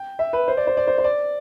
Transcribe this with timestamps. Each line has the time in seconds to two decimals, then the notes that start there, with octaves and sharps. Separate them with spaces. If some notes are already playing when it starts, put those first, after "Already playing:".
Already playing: G5
0.19 E5
0.33 B4
0.48 C5
0.57 D5
0.67 C5
0.77 D5
0.87 C5
0.98 C5
1.04 D5